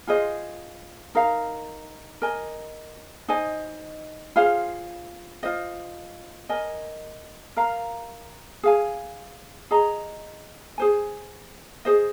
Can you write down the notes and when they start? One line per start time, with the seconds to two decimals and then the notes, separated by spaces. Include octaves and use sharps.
0.07 F4 G#4 C5 D#5
1.15 D#4 A#4 F5
2.22 A#4 D#5 G#5
3.28 D#4 C5 D#5 G#5
4.36 F4 G#4 C5 F5
5.43 F4 C5 D#5
6.49 A#4 D#5 G#5
7.57 A#4 F5 A#5
8.63 G#4 F5 G#5
9.71 G#4 D#5 A#5
10.78 G#4 C5 G#5
11.85 G#4 C5 D#5